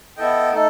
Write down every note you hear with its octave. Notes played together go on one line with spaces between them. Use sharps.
B3 E4 A4 D#5 G5
A3 D#4 A4